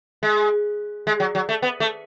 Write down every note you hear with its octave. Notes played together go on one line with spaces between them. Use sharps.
G#3
G#3
F#3
F#3
A3
B3
A3